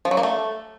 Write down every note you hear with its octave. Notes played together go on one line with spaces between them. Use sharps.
F3
F#3
A#3
A3